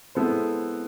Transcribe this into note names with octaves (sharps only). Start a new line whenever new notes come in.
G#3 B3 E4 A4 C5